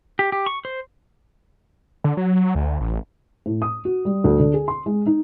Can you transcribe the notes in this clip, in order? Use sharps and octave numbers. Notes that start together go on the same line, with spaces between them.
G4
G4
C#6
C5
D3
F#3
D2
A1
A2
D#6
F#4
G3
D2
D3
G#4
C6
G#3
D#4